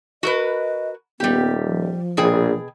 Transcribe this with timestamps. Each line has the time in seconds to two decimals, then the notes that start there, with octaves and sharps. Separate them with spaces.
0.23 F#4 A#4 B4 D#5
1.20 D#1 G3 B3 G4
1.65 F3
2.17 A#1 B2 G#4 G5